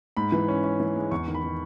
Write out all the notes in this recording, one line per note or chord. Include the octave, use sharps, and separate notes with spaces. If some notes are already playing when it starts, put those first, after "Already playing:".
G#2 B5
E3
C#4
C#4
E3
G#3
E2 C#6
D#3
B5
D#3